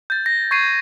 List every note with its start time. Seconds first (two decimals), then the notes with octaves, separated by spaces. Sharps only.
0.10 G6 A6
0.26 A#6
0.51 C#6 G#6 A6 C7 D#7